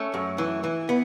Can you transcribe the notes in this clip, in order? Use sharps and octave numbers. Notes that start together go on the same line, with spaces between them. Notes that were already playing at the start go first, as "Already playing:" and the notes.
Already playing: A3 C#4
F#2
E3
E3
B3